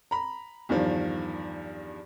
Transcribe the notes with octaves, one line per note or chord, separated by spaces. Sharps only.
A#5 B5
E2 G2 D#3 F3